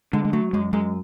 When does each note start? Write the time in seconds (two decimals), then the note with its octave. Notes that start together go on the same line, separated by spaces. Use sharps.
0.13 D3 G#3
0.25 G#3
0.33 F#3 A3
0.53 F#2 G#3
0.73 F#2 G#3